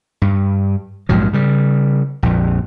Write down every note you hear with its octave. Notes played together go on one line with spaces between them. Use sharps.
G2
A#1 G#2 F3 F#3
C#3 G3
A#1 F2